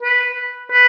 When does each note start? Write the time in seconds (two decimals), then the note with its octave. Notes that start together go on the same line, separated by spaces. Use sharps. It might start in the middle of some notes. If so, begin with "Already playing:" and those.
0.03 B4
0.72 B4